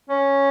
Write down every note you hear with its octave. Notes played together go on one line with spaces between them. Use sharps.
C#4